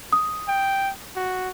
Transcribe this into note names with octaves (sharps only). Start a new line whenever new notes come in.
D#6
G5
F#4